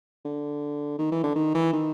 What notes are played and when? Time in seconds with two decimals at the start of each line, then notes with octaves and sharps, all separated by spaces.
0.25 D3
0.99 D#3
1.11 E3
1.23 D3
1.36 D#3
1.55 E3
1.73 D#3